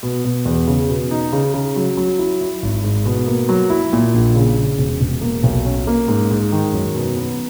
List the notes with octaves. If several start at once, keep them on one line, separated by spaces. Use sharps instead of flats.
B2
B2
E2
C#3
B2
D#4
C#3
C#3
F#3
F#3
E4
E4
G#1
G#2
B2
A#3
F#3
E4
A#2
A#1
C#3
C#3
E1
E1
A#3
B1
C#4
A#3
G#2
G#2
D#3
F#2
B2
B3